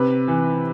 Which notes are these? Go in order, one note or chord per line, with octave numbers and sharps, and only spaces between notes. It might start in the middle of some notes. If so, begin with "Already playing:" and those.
Already playing: C3 B4
E3